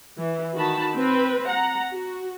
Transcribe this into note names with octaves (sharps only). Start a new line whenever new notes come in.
E3
D#3 F#4 A5 B5
C4 B4
F#5 A#5
F#4